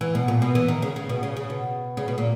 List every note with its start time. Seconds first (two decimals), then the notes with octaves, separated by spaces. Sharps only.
0.01 E3
0.15 B2
0.28 A#2
0.42 B2
0.55 E3
0.68 D#3
0.82 C#3
0.96 C#3
1.09 B2
1.23 C#3
1.37 C#3
1.50 B2
1.97 C#3
2.08 B2
2.18 A#2